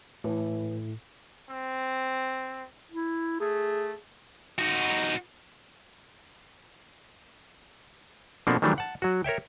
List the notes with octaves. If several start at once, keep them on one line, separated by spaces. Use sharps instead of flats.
A2 E3
C4
E4
A3 G#4
D#4 F#4
B2 F3 A#3 C4 D4 A4
D#3 E3 F#3 G3 A3 D4
F#5 A5
F#3 F#4
A#4 C#5 E5 G5